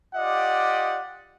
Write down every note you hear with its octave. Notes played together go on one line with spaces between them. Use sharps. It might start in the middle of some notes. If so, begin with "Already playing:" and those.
F4 G4 D5 D#5 F#5